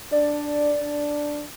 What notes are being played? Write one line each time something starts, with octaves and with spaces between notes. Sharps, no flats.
D4 D5
D4